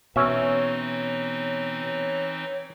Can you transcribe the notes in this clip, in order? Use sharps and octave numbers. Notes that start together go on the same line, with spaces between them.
B2 E3 C4 C#4 D#4 C#5 E5